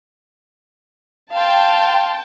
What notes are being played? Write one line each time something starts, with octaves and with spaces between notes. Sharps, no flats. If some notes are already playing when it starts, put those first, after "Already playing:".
F5 G5 A5 C6